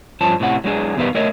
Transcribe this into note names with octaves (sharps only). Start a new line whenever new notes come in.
G2 F3 C#4 A5
A2 C3 C#4 F#5
F#3 G#3 D4 G#4
E2 B2 D#3 G3 B4 F5
A3 A#4 C#5 D#5